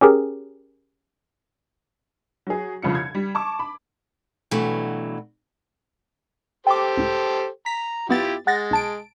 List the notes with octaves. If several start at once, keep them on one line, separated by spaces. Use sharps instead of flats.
C#4 G4 G#4 A#4
F#3 G#4
C2 F2 C#3 F4 C#7
G#6
G3
A5 C#6 D6
B5
G2 B2 E3 F#3 A3
G4 A4 C5 G5 D6
C#2 A2
A#5 B6
F#2 B3 E4 F4 G4 A6
G#3 F#5 A6 A#6
B1 A5 D7